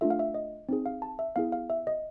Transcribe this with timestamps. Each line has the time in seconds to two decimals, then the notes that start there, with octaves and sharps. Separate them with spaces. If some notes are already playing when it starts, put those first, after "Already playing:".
0.01 A3 D4 F4 A4 E5
0.10 F5
0.19 E5
0.34 D#5
0.69 C4 D#4 G#4
0.86 F5
1.02 A5
1.19 E5
1.36 B3 E4 G#4 F5
1.52 F5
1.70 E5
1.87 D#5